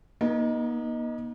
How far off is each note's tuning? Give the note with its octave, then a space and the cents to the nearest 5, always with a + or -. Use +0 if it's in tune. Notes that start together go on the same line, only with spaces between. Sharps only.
A#3 +45 D#4 +0